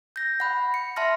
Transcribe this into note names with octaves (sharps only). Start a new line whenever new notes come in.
G6 A#6
F#5 B5
C#7
E5 A5 C6 F6 A#6